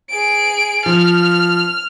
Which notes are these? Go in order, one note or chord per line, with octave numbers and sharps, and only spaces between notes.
G#4 D7
F3 F6